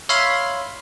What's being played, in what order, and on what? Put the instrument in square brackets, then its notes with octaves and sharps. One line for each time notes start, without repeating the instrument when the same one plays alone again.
[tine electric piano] C#5 E5 F5 B5 C6